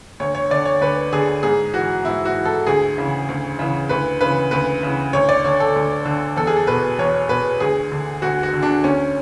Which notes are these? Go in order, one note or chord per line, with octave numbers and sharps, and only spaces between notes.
D2 C#5
C#5
D3 D5
C#5
D2 B4
D3 G#4
G#2 G#4
E3 F#4
G#2 E4
F#4
E3
A4
D2 G#4
C#3 E3
D2
C#3 E3
D2 B4
C#3 E3 B4
D2 B4
C#3 E3
D2 C#5
D5
D3 C#5
A4
D2
D3
E2 A4
G#4
A4
B2 B4
E2 C#5
B2 B4
D2 G#4
D3
D2 F#4
F#4
D3
D4
D2 C#4